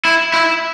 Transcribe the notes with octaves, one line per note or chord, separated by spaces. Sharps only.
E4
E4